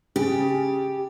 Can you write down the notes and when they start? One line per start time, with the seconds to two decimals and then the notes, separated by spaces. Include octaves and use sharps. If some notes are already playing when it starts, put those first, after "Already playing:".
0.16 C#3 G4 G#4 A6